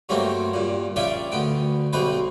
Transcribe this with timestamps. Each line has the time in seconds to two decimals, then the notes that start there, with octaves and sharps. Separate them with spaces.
0.09 G2 F#3 A3 A#3 C4
0.54 G2 A#2
0.96 A#1 C#4 F4 D5 E5 G5
1.32 D2 B3 G5
1.93 B1 B2 G3 B4 C5